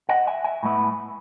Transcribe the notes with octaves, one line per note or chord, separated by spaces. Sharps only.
D#5 F#5
E5 G#5
E5 G#5
A2 G#3 B3 E4